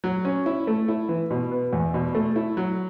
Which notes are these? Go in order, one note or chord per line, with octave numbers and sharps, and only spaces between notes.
F#3
C#4
E4
A3
E4
E3
B2
B3
E2
B2
A3
E4
F#3